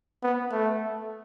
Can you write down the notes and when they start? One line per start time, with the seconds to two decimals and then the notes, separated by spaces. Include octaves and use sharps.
0.23 B3
0.51 A3